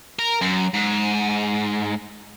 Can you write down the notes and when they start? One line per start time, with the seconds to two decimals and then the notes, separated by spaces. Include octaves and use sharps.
0.19 A#4
0.42 F#2
0.74 G#2